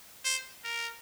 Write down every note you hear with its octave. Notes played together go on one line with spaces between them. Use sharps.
C5
A#4